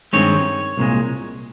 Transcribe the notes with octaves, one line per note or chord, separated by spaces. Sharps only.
G2 D#3 G#3 C4 C#5
C2 A#2 G#3